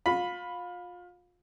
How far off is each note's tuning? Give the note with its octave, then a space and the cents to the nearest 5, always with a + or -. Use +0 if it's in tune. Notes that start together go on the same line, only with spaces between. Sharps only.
F4 +30 B5 +0